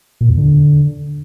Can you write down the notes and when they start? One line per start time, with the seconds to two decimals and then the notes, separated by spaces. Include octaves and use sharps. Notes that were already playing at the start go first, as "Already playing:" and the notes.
0.21 A#2
0.29 E2
0.38 D3